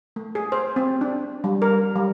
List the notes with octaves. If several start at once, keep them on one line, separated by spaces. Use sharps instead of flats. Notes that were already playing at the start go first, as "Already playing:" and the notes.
A3
G#4
C5
C4
D4
G3
A#4
G3